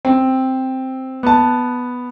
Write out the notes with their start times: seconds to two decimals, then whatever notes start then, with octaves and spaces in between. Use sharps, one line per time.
0.05 C4
1.23 B3 A5